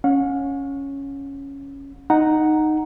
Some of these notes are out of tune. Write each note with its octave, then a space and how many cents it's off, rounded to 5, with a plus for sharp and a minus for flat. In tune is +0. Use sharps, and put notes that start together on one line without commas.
C#4 +0 F#5 -45
D#4 -10 F#5 +0 A#5 +0